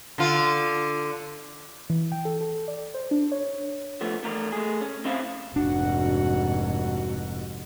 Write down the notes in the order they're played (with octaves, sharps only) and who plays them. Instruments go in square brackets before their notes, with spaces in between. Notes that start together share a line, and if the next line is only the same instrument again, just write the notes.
[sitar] D3 F4
[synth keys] E3
G5
A4
A4
D5
C5
D4
C#5
[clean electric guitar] F3 A3 B3
E2 A3 A#4
A3 G#4
C#4
C4 C#4 E4 C5 E5 F5
[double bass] F1 G#2 [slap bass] D4 [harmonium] F#4 F#5